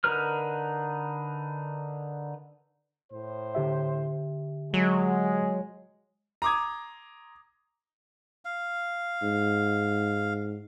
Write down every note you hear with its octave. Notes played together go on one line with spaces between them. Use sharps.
D3 D#4 A#4 B4 F6
A2 C5
D3 G4 E5
F#3 G#3
A#5 C6 D6 D#6 G#6
F5
G#2